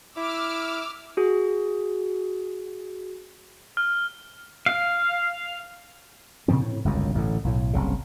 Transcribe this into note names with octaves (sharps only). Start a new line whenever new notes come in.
E4 D6 E6 F6
F#4 G#4
F6
F5
A#2 C#3 F3 C4
A2
G1 C#2 F#2
A1 A2 D3
B1 A2
F#1 C2 C#3